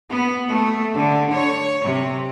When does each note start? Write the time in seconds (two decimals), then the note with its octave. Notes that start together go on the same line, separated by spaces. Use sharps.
0.10 B3
0.49 A3
0.96 D3
1.32 C#5
1.84 C3